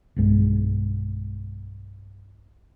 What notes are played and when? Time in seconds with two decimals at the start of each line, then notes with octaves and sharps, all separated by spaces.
0.16 B1 G2 G#3